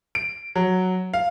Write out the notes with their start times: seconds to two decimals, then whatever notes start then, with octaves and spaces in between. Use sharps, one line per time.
0.15 D7
0.55 F#3
1.14 F5